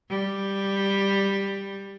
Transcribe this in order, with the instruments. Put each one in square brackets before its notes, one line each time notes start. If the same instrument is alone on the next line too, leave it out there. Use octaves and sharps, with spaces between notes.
[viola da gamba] G3